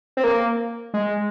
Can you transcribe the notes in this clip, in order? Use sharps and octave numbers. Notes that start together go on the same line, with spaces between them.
C4
A#3
G#3